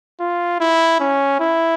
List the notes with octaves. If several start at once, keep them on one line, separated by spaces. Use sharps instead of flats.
F4
E4
C#4
E4